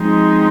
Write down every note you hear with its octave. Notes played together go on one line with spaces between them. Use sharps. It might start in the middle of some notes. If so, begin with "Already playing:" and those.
Already playing: F3 G#3 C4 D#4